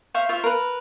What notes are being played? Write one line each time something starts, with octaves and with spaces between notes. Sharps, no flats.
C5 E5 F5 C#6
F4 C5 E5 C#6
A#4 B4